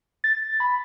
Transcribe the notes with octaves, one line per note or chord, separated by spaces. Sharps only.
A6
B5